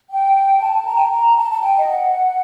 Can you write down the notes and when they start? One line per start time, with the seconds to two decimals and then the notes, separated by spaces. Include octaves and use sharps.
0.11 G5
0.60 A5
0.85 A#5
0.96 G5
1.04 A5
1.11 A#5
1.37 A5
1.52 A5
1.62 G5
1.77 D#5
1.86 F#5